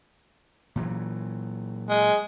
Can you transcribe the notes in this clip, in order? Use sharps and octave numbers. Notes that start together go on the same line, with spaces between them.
A#2 E3 F#3
G#3